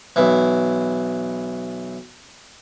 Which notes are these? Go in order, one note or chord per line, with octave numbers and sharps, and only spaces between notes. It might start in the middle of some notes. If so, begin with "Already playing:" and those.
B1 E3